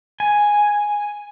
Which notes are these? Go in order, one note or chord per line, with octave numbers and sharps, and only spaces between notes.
G#5